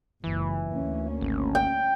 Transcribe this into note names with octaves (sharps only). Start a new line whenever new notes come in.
F#1 C#2 E3
D2 A#3 C#4
G#1
G5